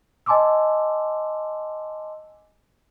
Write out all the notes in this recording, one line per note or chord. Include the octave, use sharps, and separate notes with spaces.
D#5 G#5 A5 C6 D6 E6